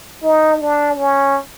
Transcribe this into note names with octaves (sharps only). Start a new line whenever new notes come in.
D#4
D4
C#4